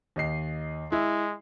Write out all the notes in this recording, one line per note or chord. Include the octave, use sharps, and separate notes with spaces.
D#2 D#5 C7
G#3 E4